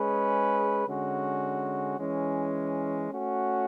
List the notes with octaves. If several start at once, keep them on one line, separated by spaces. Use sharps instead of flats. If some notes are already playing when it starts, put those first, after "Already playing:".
Already playing: G#3 C#4 G#4 B4
D3 G#3 C#4 F#4
E3 G#3 C#4
A3 C#4 F#4